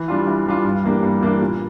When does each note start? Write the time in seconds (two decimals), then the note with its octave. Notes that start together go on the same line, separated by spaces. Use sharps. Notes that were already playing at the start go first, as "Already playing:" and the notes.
Already playing: E3
0.08 G3 D4 F4
0.27 E3
0.46 G3 D4 F4
0.65 G2
0.84 E3 A#3 D4 G4
1.03 G2
1.22 E3 A#3 D4 G4
1.41 A#2